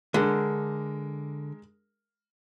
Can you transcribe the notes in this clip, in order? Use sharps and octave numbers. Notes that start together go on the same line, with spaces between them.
D3 G#3 A#4